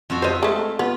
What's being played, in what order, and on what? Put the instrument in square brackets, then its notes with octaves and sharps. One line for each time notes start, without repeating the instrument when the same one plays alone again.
[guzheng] F2 F4 F#4
[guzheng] F4 E5 [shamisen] C5 D#5
[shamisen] G#3 A3
[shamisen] B3 [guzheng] F4